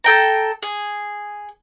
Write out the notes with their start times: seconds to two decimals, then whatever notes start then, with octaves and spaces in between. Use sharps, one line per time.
0.04 A4 G5 A#5
0.63 G#4